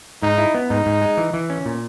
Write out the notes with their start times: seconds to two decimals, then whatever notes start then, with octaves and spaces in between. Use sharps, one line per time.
0.22 G#2 D#4
0.38 E4
0.55 B3
0.70 G#2 D#4
0.86 G#2
1.02 G#3
1.17 E3
1.34 E3
1.50 C#4
1.66 A#2